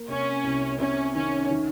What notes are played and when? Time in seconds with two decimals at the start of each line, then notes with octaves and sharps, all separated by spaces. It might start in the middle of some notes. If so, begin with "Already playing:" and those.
Already playing: A#3
0.08 C3 C#4
0.44 C2
0.80 C3 C#4
1.15 D#3 C#4
1.51 D#3